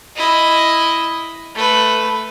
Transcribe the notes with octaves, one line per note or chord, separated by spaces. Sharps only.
E4 D#5
A3 B4